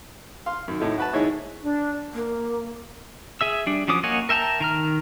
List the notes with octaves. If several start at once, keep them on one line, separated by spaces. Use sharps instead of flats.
F5 C6
F#2 D#3
A2 D#4 A4
F#4 B4 A5
G#2 D#3 E4 G#4 C#5 D#5
D4
A#3
G#4 E5 E6
G3 D4
F3 F#3 C#4 D6 D#6
A#3 C#5 D#5 F#5 G#5
A#4 E5 G5 A5 A#5
D#3 A#5 F6